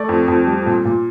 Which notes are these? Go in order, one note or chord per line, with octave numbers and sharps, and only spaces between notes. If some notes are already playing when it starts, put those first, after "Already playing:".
Already playing: A3 D5
F2
F2
G3
A#2
A#2